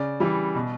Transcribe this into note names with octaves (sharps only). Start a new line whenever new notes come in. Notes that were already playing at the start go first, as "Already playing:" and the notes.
Already playing: C#3 D5
E3 G3
B2